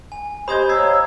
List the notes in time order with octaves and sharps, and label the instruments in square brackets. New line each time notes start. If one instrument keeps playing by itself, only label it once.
[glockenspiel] G#5
[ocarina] G4 [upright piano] C5 D#5 G6 [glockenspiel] B5 D#6 G#6
[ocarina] C#5 [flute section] F5 E6 [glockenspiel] A#5 C7 [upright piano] G#6